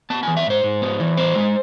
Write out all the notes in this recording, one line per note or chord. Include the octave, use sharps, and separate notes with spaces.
B3 A5
E3 G#5
E5
G#2 C5
G#2
B3
E3
B3 C5
G#3